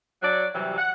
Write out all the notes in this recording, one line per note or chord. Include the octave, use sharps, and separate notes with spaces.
F#3 D5
C3 E3 F#3 G3
F#5